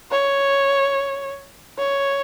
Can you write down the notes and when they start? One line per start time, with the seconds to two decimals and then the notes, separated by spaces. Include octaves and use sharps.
0.12 C#5
1.78 C#5